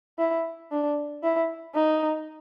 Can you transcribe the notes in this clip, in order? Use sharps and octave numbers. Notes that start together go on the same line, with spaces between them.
E4
D4
E4
D#4